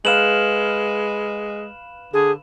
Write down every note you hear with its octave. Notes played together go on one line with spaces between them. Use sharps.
G#3 B4 F5 E7 F#7
D3 G#4